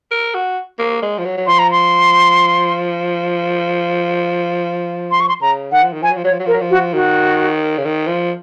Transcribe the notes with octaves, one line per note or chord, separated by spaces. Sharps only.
A#4
F#4
A#3
G#3
F3
F#3
F#3
F3 C6
A#5
C6
C6
C#6
C6
C#3 A#5
D#3 F#5
F3
D#3
F3 G#5
F#3
F3
F#3 C#5
F3
F#3
F3 A#4
F#3
F3
F#4
D#3 F#4
C#3
D#3
F3